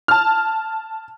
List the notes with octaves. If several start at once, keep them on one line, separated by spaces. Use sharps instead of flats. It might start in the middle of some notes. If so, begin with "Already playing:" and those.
A5 F6